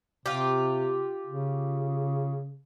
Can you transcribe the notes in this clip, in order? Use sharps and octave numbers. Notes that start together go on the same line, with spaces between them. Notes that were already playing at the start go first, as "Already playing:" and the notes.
C3 F4 G4
C#3